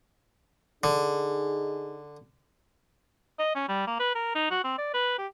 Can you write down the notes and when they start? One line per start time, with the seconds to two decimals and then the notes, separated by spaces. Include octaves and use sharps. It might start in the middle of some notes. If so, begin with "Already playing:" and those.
0.84 D3 D#4 G#4
3.39 D#5
3.55 C#4
3.69 G3
3.87 A#3
4.00 B4
4.15 A#4
4.35 D#4
4.51 F#4
4.64 C4
4.78 D5
4.94 B4
5.18 G4